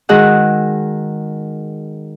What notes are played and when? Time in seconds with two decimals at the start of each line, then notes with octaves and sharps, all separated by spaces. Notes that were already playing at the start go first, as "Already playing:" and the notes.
0.09 D#3 G#3 F#4 G#4 F#5 E6